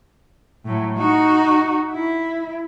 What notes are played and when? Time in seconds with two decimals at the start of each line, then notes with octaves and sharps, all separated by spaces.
0.65 A2 F#3
0.96 D#4 F#4
1.90 E4